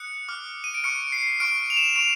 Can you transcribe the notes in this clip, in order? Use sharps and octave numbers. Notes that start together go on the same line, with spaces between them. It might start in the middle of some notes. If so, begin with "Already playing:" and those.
Already playing: D#6 F#6 C#7
D6 F6
D#7
D7
C#6 F6 C#7
C7
C#6 F6 D7
F7
E7
C#6 D7